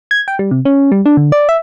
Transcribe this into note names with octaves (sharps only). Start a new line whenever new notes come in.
G#6
G5
G3
C3
C#4
G3
D4
D3
D5
E5